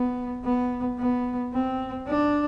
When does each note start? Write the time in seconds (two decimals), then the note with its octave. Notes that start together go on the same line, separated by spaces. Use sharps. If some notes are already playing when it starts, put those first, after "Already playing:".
Already playing: B3
0.44 B3
0.99 B3
1.53 C4
2.07 D4